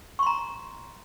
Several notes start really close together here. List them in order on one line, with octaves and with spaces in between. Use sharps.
C#6 C6 A#5